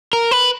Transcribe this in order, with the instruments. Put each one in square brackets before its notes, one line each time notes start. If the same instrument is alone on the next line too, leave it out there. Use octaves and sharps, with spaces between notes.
[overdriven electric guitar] A#4
B4